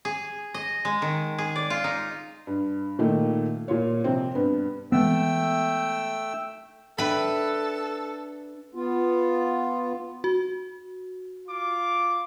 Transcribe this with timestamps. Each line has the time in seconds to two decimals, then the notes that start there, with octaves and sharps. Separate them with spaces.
0.05 G#4
0.54 D#5
0.85 G#3
1.02 D#3
1.38 G#4
1.56 D5
1.70 F4
1.84 D#4
2.47 G2
2.99 A#2 D#3 A3
3.68 A#2 F4 C#5
4.04 F2 C3 C4
4.35 G2 B3
4.92 E3 G#3 A3 B3 G5 E6
6.98 D4 A4 B4 E5 G5 B5
8.75 B3 F4
10.24 F#4
11.47 F4 D6